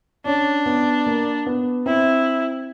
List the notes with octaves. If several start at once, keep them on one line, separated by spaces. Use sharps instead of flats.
C#4 D4
B3
A#3
B3
C4 E4